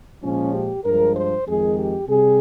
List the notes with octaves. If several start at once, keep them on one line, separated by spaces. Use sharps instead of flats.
A#2 F3 G#3 C#4
G4
G2 F3 G#3 A#4
C5
F2 D#3 G#3 G#4
G4
C3 G3 G#4